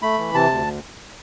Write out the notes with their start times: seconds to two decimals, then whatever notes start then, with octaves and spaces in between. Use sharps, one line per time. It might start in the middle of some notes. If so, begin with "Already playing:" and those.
0.02 A3 B5
0.19 E3
0.34 C3 A5
0.51 D2